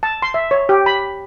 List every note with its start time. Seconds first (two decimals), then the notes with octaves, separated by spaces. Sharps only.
0.03 A5
0.22 C6
0.34 E5
0.51 C#5
0.69 G4
0.86 B5